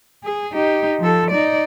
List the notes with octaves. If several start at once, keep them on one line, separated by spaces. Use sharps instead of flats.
G#4
D#4 G4
F3 A4
D#4 D5